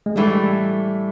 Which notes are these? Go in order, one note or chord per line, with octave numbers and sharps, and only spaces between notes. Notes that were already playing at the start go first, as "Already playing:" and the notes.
G#3
A2 E3 G3 A3 D4